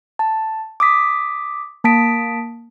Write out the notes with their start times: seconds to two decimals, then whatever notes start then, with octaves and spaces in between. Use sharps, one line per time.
0.19 A5
0.80 D6 D#6 B6
1.84 A#3 A5 D#6 B6 D7